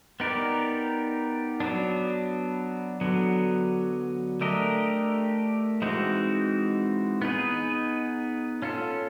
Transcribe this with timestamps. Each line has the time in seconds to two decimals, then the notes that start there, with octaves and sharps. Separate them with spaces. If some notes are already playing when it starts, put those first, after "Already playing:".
0.20 B3 D#4 G4 A#4 D5
1.60 F#3 B3 D4
3.01 D3 F#3 B3
4.41 A3 D4 G4 A#4 D#5
5.82 E3 G#3 C4 D#4 F#4
7.22 B3 D#4 G#4 B4
8.62 C#4 F4 A4